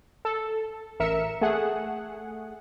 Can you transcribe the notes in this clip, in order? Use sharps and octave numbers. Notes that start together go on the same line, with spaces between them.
A4
A1 A#4 E5 C#7 E7
A3 G#4 F#5